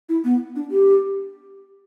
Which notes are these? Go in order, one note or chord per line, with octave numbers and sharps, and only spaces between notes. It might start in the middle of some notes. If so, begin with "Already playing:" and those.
E4
B3
D4
G4